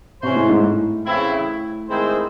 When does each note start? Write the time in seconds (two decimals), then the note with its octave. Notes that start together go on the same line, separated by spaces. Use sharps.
0.22 C3 E3 G#3 C#4 F#4 C5
0.36 A2
0.49 G#2
0.63 A2
1.06 C#3 E3 C4 E4
1.89 D#3 G#3 C4 E4 C5